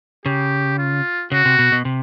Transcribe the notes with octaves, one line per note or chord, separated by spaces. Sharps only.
C#3 G4
F4
C#3 F#4
C3
B2
B2
C3